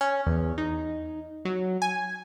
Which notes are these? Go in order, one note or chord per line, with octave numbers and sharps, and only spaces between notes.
C#4
E2
D#4
F#3
G#5